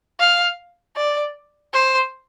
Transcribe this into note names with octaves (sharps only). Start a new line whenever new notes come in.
F5
D5
C5